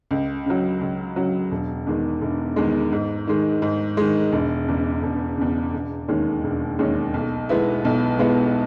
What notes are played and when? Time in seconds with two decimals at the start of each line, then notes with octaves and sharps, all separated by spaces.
0.11 C#2
0.46 C#3 F#3
0.81 C#2
1.16 C#3 F#3
1.51 E1
1.87 E2 D#3 G#3
2.21 E1
2.56 E2 D#3 G#3
2.92 G#2
3.27 D#3 G#3
3.62 G#2
3.97 D#3 G#3
4.32 E1
4.67 E2 C#3
5.03 E1
5.37 E2 C#3
5.73 E1
6.08 D#2 D#3 G#3 C#4
6.44 E1
6.79 D#2 D#3 G#3 C#4
7.14 B1
7.49 B2 G#3 B3 E4
7.85 B1
8.19 B2 G#3 B3 E4